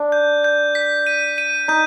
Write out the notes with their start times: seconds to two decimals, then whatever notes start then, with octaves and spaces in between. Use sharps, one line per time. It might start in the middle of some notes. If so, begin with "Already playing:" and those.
Already playing: D4
0.12 G6
0.44 G6
0.75 B6
1.07 D#7
1.38 D#7
1.68 D#4 G6